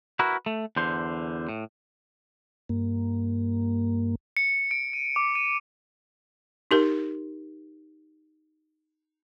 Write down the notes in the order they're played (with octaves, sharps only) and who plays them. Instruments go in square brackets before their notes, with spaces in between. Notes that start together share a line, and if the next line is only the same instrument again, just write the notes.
[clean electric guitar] E4 F#4 A#4 B4
A3
E2 D3 C5
A2
[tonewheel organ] G2 A#3
[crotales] C#7
D7
D#7
D6
D#7
[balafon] D#4 G4 A#4